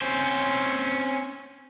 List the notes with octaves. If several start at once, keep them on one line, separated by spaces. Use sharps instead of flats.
C4 C#4 C5